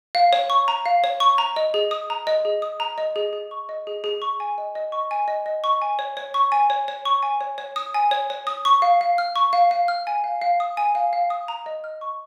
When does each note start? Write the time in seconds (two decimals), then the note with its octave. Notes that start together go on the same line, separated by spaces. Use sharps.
0.15 F5
0.33 C#5
0.50 C#6
0.68 A#5
0.86 F5
1.04 C#5
1.20 C#6
1.38 A#5
1.56 D#5
1.74 G#4
1.91 D#6
2.10 A#5
2.27 D#5
2.45 G#4
2.62 D#6
2.80 A#5
2.98 D#5
3.16 G#4
3.33 G#4
3.51 C#6
3.69 D#5
3.87 G#4
4.04 G#4
4.22 C#6
4.40 G#5
4.58 D#5
4.75 D#5
4.92 C#6
5.11 G#5
5.28 D#5
5.46 D#5
5.64 C#6
5.82 G#5
5.99 C#5
6.17 C#5
6.34 C#6
6.52 G#5
6.70 C#5
6.88 C#5
7.05 C#6
7.23 G#5
7.41 C#5
7.58 C#5
7.76 D#6
7.94 G#5
8.11 C#5
8.30 C#5
8.47 D#6
8.65 C#6
8.82 F5
9.01 F5
9.18 F6
9.36 C#6
9.53 F5
9.71 F5
9.88 F6
10.07 G#5
10.24 F5
10.42 F5
10.60 D#6
10.77 G#5
10.95 F5
11.13 F5
11.30 D#6
11.48 A#5
11.66 D#5
11.84 F6
12.01 C#6